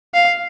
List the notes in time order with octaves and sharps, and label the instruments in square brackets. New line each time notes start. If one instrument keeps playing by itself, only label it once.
[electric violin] F5